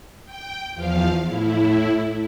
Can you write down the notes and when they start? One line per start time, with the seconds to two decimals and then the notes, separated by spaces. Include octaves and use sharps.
0.25 G5
0.73 E2 F3 F5
1.26 A2 E4